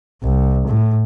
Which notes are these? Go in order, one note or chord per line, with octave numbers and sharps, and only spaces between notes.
C2
A2